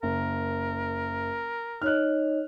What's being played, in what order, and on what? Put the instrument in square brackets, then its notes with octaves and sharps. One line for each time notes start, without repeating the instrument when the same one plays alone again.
[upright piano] F#1 [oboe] A#4
[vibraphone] D#4 C#5 D#5 [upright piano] F6 F#6